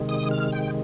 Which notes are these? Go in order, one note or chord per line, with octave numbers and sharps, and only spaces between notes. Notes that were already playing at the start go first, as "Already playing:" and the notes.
Already playing: C3 D#3 G#3
D#6
F6
G5